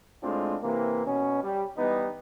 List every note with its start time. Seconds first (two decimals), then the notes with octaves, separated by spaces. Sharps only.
0.24 A2 G#3 C4 D4 F4
0.63 C3 E3 A#3
1.06 B2 C#4
1.44 G3
1.78 E3 G3 B3 D#4